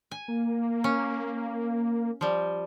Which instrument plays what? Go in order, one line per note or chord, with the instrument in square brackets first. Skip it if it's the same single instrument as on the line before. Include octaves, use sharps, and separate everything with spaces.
[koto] G#5
[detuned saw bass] A#3
[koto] C#4
F3 G3